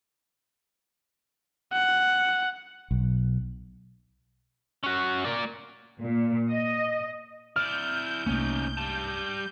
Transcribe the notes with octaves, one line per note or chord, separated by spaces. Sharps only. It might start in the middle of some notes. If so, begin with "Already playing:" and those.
F#5
B1
C#4 F#4
A#3 D5
A#2
D#5
E4 D5 F6 G6
C2 A3 A#3 C#4 D#4
G3 A5